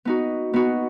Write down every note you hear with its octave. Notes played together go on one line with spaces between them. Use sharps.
B3 D#4 F#4
B3 D#4 F#4